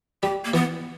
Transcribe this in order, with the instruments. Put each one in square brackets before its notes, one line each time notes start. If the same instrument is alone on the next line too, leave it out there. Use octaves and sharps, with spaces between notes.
[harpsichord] G3 [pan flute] G4
[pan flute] A#3
[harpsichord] E3 [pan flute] B3